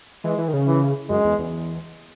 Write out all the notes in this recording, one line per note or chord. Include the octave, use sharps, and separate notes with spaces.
E3 G#3
E3
D#3
C#3
E3
F#2 G#3
E2
E2